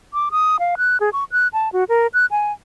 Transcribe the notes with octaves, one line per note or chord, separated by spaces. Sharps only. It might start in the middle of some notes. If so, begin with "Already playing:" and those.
D6
D#6
F5
F#6
G#4
C#6
F#6
A5
F#4
A#4
F#6
G#5